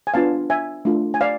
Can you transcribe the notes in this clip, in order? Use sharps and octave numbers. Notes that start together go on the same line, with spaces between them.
G#5
B3 D4 F4 F5 A5
E5 G#5
A3 D4 F4
G#5
D5 F5